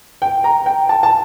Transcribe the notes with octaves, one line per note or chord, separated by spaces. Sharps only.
G5
A#5
G5
A5
A5